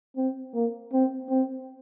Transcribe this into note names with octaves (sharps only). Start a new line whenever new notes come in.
C4
A#3
C4
C4